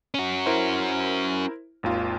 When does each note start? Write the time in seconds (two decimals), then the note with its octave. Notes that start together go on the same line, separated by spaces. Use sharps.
0.14 C#4 F#4
0.46 E4 A#4 C5
1.83 G#1 D#2 F4